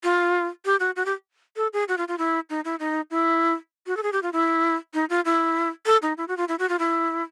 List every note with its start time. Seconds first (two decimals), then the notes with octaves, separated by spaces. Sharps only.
0.04 F4
0.65 G4
0.80 F#4
0.96 F#4
1.06 G4
1.57 A4
1.73 G#4
1.88 F#4
1.98 F4
2.08 F4
2.18 E4
2.50 D#4
2.65 E4
2.80 D#4
3.11 E4
3.87 F#4
3.97 A4
4.03 G#4
4.13 G4
4.23 F4
4.33 E4
4.94 D#4
5.10 F4
5.25 E4
5.86 A4
6.02 D#4
6.18 E4
6.28 F#4
6.37 F4
6.48 E4
6.59 F#4
6.69 F4
6.79 E4